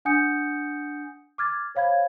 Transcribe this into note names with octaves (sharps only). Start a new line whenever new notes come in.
D4 F#5 G#5 D#6 G6 C#7
D6 F6 G#6 A6
C5 C#5 F5 B5 G#6